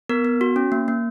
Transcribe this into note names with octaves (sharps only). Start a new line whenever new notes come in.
B3 A#4
B3
F#4
C#4
A#3
A#3